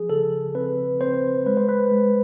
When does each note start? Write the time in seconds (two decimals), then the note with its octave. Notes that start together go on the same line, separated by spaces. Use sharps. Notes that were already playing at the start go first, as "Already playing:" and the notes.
Already playing: F3 G#4
0.09 C#3 A4
0.55 C4 B4
1.01 C4 C5
1.46 G#3 B4
1.57 C5
1.69 B4
1.92 G#3